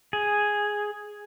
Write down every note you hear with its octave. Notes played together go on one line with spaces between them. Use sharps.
G#4